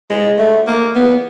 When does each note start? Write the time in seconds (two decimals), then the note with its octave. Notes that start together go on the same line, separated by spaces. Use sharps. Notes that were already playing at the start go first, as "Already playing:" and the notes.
0.10 G#3
0.39 A3
0.67 A#3
0.95 B3